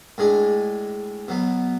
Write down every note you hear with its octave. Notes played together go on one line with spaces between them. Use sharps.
A2 G#3 D4 G#4
B2 F#3 B3